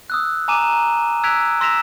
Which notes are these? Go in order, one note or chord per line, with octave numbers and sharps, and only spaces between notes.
D#6 E6 F#6
G#5 A#5 D6 D#7 E7
E6 F#6 G#6 B6 D7 F7
C6 E6 A#6 B6 E7 F7